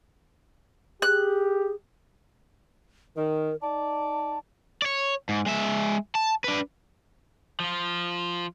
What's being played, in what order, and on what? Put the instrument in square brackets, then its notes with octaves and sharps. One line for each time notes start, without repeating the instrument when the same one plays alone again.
[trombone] G4 [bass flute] G#4 [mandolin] F#6
[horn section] D#3 [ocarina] A#4
[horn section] D#4 D5 [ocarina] A5
[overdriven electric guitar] C#5 D5
G#2
G#3 E5
A5
D4 B4
F3 F4